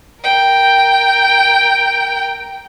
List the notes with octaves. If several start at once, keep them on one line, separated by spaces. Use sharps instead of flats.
A#4 G5